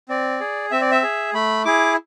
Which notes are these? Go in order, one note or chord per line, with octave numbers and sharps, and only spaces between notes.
C4 D5
G#4
C4 E5
D5
E5
G#4
A3 B5
E4 G#4 D6